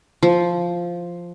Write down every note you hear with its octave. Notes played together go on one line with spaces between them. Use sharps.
F3